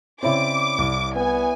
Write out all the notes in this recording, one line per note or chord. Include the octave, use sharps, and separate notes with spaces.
C#3 C4 E4 C#5 D5 D6
C2
B3 G#5